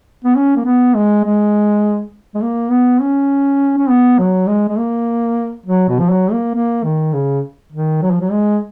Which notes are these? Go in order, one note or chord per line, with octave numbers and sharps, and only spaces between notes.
B3
C#4
A#3
B3
G#3
G#3
G#3
A#3
B3
C#4
C#4
B3
F#3
G#3
G#3
A#3
F#3
B2
F3
F#3
A#3
A#3
D#3
C#3
D#3
F#3
F3
F#3
G#3